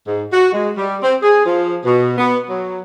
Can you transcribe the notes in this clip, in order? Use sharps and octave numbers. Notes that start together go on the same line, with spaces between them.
G#2
F#4
G#3
G3
C4
G#4
F3
B2
B3
F#3